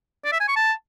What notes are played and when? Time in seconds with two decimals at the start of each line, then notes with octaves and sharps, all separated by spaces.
0.25 D5
0.32 E5
0.40 G#5
0.48 C#6
0.56 A5